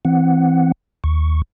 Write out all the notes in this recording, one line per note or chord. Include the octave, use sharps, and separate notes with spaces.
E3 C4 F#5
D#2 C#6